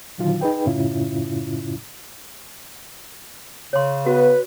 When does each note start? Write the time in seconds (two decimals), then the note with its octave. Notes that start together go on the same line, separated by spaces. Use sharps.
0.18 A#2 D3 D#3 F#3 F4
0.41 D#4 G#4 B4 G5
0.65 F#2 A2 C#3 C#4 E4 F4
3.73 C#3 C#5 C6
4.06 B3 F#4 B4